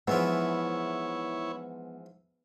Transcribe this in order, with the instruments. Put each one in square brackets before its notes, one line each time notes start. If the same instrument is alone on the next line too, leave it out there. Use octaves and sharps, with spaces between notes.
[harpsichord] G#2 E3 F3 [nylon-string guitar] B3 [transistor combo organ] E4 C#5